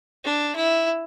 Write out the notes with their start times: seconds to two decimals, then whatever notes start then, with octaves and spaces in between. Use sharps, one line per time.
0.24 D4
0.56 E4